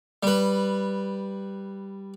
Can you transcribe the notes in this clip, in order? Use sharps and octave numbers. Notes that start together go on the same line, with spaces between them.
G3 B4